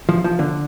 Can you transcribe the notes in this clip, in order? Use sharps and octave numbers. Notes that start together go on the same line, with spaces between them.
F3
F3
D3